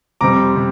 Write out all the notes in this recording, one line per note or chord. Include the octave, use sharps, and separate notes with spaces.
F2 C3 G3 C4 A#5 D6
C3